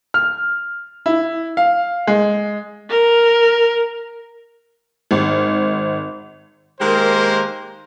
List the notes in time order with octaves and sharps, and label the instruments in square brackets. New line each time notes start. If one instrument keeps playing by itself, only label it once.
[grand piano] F6
E4
F5
G#3
[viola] A#4
[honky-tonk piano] G#1
[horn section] D#3 G#3 A#3 G4 A#4 C5